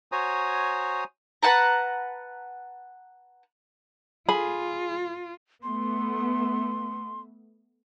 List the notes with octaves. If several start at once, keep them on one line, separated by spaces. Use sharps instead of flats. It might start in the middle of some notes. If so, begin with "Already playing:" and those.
F#4 C5 C#5 G#5 A#5 D#6
B4 F#5 A5 A#5
F4 G#4 B5
A3 B3 C6